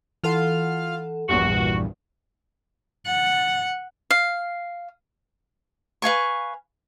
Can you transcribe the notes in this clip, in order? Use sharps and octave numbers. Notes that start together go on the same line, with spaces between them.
E3 F4 A4 F5 F#5
A#1 E2 G2 F#4
F#5
F5
B4 F5 G#5 C#6